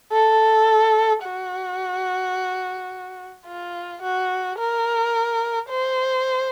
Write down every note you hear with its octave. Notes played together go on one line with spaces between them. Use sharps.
A4
F#4
F4
F#4
A#4
C5